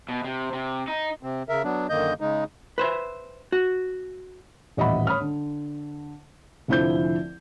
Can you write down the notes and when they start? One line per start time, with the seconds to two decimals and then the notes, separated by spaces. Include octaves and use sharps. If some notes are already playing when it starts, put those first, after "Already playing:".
0.09 B2
0.24 C3
0.53 C3
0.88 D#4
1.23 C3 C4
1.49 C#3 A#4 E5
1.64 F#3 B3 D4
1.90 F#2 D3 D#3 A#3 D#5 G6
2.21 C#3 G#3 D#4
2.78 B4 C5 E5
3.52 F#4
4.77 D#1 A1 D#5 E5 F#5 B5
5.07 C#5 B5 D#6 F6
5.21 D3
6.68 F1 D3 F3 E4 C5 G6